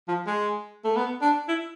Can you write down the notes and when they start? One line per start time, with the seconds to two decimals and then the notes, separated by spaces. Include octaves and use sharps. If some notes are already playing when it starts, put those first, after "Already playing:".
0.08 F3
0.27 G#3
0.84 A3
0.96 B3
1.22 D4
1.48 E4